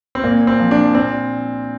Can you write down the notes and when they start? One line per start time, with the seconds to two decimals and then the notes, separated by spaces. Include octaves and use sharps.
0.15 C4
0.24 A#2 A#3
0.47 C4
0.60 F3
0.71 D4
0.94 A#2 C4